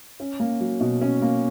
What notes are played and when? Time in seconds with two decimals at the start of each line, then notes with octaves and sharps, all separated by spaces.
0.20 C#4
0.40 A#3
0.61 F#3
0.81 B2
1.02 C#4
1.22 A#3